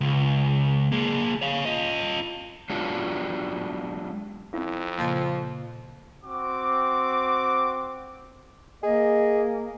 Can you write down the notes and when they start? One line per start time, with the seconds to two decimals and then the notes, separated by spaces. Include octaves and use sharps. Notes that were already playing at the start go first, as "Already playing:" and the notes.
0.01 C#2
0.92 A#3 G#4
1.42 C#5 F5
1.66 F4 D#5
2.70 F#3 G#3 B3 D4 F4 G4
4.54 F2 C4 E4
4.98 A#2 C#3 F3 A#3
6.24 C4 F#4 D6
8.83 A#3 G#4 D#5